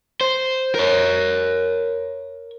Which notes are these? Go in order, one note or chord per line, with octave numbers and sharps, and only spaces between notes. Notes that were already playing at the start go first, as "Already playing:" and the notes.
C5
A#4 C#5